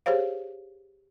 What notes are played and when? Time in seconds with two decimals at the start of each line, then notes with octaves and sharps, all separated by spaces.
0.06 G4 G#4 C5 C#5 F5